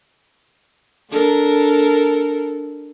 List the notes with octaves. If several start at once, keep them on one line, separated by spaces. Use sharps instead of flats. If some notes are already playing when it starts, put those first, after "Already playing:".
D4 A4 A#4